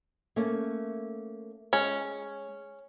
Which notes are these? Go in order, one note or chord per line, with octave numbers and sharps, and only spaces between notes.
A3 A#3 C#4
G#3 C#4